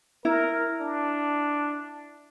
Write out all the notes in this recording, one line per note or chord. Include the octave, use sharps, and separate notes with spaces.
E4 A#4
D4